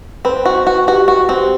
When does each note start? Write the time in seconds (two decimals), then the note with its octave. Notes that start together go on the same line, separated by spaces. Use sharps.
0.25 C4 B4
0.45 F#4
0.67 F#4
0.87 F#4 G4
1.08 F#4
1.29 C4